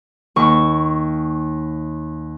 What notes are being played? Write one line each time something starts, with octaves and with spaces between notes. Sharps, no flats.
D#2 D#3 C#6